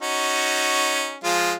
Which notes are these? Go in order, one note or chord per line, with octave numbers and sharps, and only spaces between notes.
C#4 D#4 F#4
F3 G#3 F4